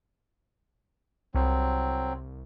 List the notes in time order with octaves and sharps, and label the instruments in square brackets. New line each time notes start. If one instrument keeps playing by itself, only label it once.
[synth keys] C2 [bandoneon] F#3 C4